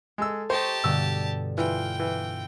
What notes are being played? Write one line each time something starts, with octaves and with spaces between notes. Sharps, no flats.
G#3 A4 E6
G4 C5 D#5 A5 A#5 C#6
G2 B2 D3 E6
E3 F4 G5
E3